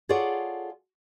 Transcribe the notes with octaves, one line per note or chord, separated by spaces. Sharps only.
F4 G#4 A4 C#5 D5 F#5